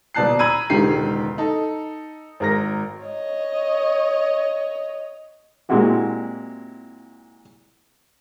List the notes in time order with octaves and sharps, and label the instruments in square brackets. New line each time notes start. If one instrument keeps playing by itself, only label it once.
[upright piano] D#1 B2 D5 A5 F#6 C7
A#5 B5 E6 G#6 D#7
E1 C#2 D3 D#3 G4 C7
D#4 A4
G#1 A#4 A#6
[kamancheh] C#5 D#5
[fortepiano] A#2 G#3 C4 E4 F#4 G4